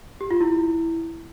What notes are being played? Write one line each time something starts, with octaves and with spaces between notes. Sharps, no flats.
G4
F4
E4